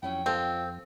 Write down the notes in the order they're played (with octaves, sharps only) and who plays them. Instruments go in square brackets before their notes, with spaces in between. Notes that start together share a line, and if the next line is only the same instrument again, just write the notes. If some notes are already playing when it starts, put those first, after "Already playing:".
[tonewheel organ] F2 [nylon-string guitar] F#3 C#4 E4 [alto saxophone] G5
[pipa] C4 [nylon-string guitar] F4 A4 D#5